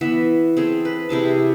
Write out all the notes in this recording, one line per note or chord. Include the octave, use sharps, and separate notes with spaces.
E3 B3 E5
C4 G#4 A4
B4
C3 E4 G#4 A5